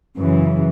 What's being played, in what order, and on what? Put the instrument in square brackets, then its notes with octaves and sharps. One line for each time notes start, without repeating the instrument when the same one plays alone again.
[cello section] F#2 C#3 E3